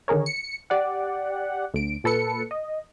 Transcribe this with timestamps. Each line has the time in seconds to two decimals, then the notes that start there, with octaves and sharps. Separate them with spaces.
0.08 D3 D#3 G#4 A#4 C#5
0.26 C#7
0.70 G4 D5 F#5
1.74 D2 D7
2.04 A#2 A4 B4 C#7
2.51 D#5